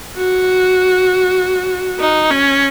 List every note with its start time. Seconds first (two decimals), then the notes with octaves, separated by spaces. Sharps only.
0.17 F#4
2.00 D#4
2.30 C#4